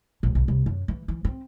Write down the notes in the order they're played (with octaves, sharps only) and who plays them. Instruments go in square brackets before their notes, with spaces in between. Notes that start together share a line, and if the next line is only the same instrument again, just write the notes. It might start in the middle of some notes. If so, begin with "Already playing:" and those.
[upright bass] A#1
B1
C2
F#2
E3
E3
C4